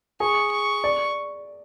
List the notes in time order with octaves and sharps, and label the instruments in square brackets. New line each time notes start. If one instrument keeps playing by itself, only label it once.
[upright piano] G#4 [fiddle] C#6
[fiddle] C#6
[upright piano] D5